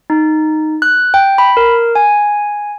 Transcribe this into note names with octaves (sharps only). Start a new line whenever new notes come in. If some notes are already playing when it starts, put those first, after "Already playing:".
D#4
F#6
G5
B5
A#4
G#5